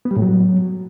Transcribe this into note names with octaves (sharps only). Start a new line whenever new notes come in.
B3
G3
A2
F#3